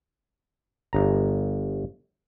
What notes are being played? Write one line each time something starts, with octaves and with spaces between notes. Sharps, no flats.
G1 A#5